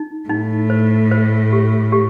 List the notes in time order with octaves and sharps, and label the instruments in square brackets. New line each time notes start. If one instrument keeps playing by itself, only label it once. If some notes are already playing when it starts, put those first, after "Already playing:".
Already playing: [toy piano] D#4
[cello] A2 [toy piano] D#4
[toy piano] C5
C5
G4
G4